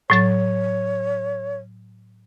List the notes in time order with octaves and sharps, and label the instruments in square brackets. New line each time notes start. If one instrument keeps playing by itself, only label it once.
[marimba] A2 F#3 A6 [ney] C#5